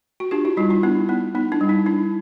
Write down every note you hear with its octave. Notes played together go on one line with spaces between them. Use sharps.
F#4
D4 F4 G4
E4 F#4
G3 D#4 F4
D#4 F4
B3 D4 E4
B3 D#4
B3 D#4
D4 E4
G3
D#4
D4 E4